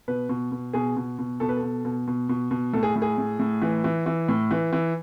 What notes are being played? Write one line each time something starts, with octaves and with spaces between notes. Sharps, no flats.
B2 B4
B2
B2
B2 G#4
B2
B2
B2 A4
B4
A4
B2
B2
B2
B2
B2
A2 A4
G#4
A2
G#4
A2
A2
E3
E3
E3
A2
E3
E3